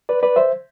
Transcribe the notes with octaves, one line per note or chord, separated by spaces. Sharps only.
B4 D5
B4 D5
C5 E5